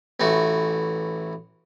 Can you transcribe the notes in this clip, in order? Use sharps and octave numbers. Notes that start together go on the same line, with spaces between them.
A1 E3 A3 F#4